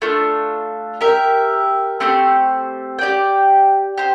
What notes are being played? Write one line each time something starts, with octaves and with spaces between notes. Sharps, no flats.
A3 D4 F4
G4 A#4 E5
A3 C4 G4 C5
G4 D5 G5
G4 C5